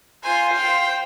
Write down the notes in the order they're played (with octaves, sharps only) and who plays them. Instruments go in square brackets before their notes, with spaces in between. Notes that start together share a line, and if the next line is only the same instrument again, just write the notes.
[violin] F4 G#5 [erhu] C5
[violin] F5 G5